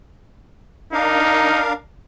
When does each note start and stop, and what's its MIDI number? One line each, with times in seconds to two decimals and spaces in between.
0.93 1.73 62
0.93 1.63 63
0.93 1.73 70
0.93 1.73 77